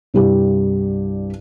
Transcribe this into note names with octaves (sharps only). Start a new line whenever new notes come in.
C2 G2 G4